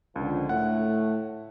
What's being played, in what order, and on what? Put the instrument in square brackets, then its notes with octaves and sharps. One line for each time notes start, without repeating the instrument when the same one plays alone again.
[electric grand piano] C#2 [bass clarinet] D3 [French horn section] D#3 F3 D4
[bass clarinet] A2 [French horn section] A3 [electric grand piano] F#5